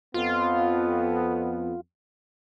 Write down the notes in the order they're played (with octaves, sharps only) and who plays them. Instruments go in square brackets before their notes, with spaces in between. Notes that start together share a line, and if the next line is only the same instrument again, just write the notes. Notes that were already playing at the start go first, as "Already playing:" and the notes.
[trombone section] F2 B3 [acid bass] F4